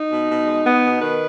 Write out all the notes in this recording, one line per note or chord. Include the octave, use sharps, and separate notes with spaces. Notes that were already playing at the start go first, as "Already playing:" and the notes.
Already playing: D#4
B2
B2
G#3
B3
B2
D#3 B4